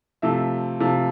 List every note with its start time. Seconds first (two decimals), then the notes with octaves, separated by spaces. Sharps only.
0.22 C3 F3 A3 E5
0.80 C3 F3 A3